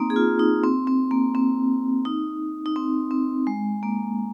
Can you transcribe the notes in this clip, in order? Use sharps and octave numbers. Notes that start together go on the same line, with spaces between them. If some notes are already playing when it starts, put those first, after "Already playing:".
Already playing: A#3 C4 D#4
G#4
F4
D#4
C4
C4
A#3
C4
D#4
D#4
C4
C4
G#3
A#3